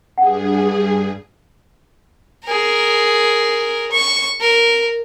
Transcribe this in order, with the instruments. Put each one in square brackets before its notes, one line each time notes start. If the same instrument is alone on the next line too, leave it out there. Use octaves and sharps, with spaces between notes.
[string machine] G2 G#4 [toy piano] F#5
[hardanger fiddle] G#4 A#4
C#6
A#4